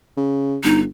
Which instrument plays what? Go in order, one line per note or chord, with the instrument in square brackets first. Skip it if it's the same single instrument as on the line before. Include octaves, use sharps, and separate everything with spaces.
[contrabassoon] C#3
[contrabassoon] G1 [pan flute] D#4